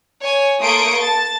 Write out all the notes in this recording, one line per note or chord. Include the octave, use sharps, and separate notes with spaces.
C#5 G#5
A3 A#3 C6 C#6 D#6 D7
A5 A6